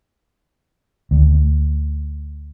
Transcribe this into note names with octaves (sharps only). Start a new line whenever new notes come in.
D2